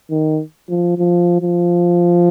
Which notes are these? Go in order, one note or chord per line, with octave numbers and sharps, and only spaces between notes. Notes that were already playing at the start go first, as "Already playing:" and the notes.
D#3
F3
F3
F3